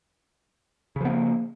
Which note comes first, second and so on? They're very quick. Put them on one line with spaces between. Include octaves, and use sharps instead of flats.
C#3 F3 B3 A#3